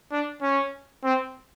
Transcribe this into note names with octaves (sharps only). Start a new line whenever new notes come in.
D4
C#4
C4